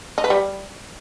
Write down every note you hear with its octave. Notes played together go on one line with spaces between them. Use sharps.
D#4
B4
G3